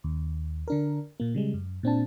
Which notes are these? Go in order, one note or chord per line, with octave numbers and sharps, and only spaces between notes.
D#2
D3 D4 A#4
A#2 A#3
C#3 G3 G#3
F#2
A#2 C4 D4 A5